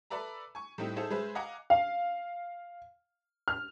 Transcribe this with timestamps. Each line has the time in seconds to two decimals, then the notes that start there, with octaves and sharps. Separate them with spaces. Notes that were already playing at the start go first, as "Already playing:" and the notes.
0.10 A4 B4 D5 E5 A#5
0.55 G#5 C#6
0.78 A2 G3 C4 D#4 E4
0.96 D#4 G#4 A4 C5 E5
1.10 G#3 G#4 B4 C5 E5
1.35 D#5 F5 F#5 G#5 A#5 D6
1.70 F5
3.48 F6